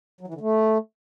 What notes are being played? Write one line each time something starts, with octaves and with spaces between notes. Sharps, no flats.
F#3
E3
D3
A3